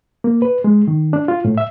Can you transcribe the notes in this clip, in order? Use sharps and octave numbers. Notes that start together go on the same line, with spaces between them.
A#3
B4
G#3
D#3
D4
F4
A2
E5